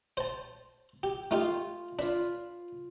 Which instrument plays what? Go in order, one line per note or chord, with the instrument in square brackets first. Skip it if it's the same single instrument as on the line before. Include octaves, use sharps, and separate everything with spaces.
[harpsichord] C5 A5
G4
[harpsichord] A3 D#4 G4 [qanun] F4 F5
[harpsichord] D4 [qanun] F4 B4